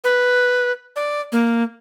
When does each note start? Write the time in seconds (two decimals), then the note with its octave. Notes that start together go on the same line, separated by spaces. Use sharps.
0.04 B4
0.96 D5
1.32 A#3